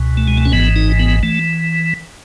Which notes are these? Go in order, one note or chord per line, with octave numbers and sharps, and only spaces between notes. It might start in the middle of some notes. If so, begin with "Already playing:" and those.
Already playing: C#2 B2
A3
G#3
A3
C#4
G#1 G#2 E3 B3
D#4
B3
E3 A3